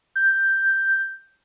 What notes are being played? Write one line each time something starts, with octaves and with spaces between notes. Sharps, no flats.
G6